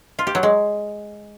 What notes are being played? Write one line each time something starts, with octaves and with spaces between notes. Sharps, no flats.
F4
G4
F#3
G#3